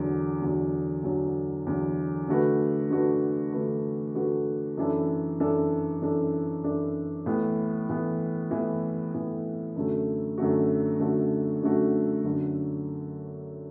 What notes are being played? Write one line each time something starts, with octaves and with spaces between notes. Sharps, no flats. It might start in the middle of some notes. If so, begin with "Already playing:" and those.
Already playing: E2 D3 F#3
E2 D3 F#3
E2 D3 F#3
E2 D3 F#3
D3 A3 F#4 B4
D3 A3 F#4 B4
D3 A3 F#4 B4
D3 A3 F#4 B4
F#2 E3 D4 A4
F#2 E3 D4 A4
F#2 E3 D4 A4
F#2 E3 D4 A4
A2 E3 B3
A2 E3 B3
A2 E3 B3
A2 E3 B3
F#2 D3 A3 F#4
F#2 D3 A3 F#4
F#2 D3 A3 F#4
F#2 D3 A3 F#4
F#2 D3 F#3